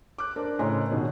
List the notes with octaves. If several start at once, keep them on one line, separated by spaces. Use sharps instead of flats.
D6 F#6
D4 A#4 C5 D5
A2 C#3 D#5 G#5 A#5 C6
B2 D#3 D4